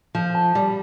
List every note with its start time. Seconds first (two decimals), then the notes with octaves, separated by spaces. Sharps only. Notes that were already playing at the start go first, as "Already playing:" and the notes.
0.15 F3 A4
0.35 A5
0.55 G3 D5